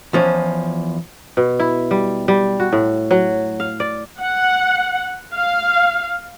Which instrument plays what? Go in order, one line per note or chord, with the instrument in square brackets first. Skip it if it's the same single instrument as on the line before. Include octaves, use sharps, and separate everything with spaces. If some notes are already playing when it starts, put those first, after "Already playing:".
[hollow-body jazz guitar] E2 F3 C#4
[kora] B2
E4
G3
G3
F#4
A2
F#3
F5
D5
[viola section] F#5
F5